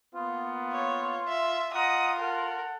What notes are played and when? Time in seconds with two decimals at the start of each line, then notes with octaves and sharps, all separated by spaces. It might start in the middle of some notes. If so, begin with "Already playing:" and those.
0.15 A#3 B3 F4
0.72 C#5
1.29 E5
1.75 F4 D#5 F#5 A#5 D#6
2.20 A4 A#4 F#5